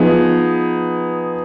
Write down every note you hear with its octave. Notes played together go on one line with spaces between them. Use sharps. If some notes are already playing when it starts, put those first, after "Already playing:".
Already playing: F3 B3 D#4 G#4